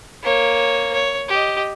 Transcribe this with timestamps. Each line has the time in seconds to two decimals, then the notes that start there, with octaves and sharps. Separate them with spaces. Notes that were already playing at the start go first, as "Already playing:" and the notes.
0.23 A#3 C#5
0.93 C#5
1.28 G4 D#5